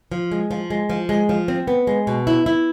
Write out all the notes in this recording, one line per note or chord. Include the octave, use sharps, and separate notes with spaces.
F3
G#3
F3
G#3
F3
G#3
F3
C4
B3
G#3
B2
E4
E4